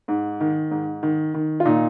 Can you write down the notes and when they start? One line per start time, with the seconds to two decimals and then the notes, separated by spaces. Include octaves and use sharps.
0.08 G#2
0.40 D#3
0.71 G#2
1.03 D#3
1.34 D#3
1.60 F4
1.65 A#2 D#4